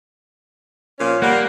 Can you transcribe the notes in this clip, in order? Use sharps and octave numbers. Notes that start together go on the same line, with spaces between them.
A#2 F3 C#4
G3 A#3 D4 F#5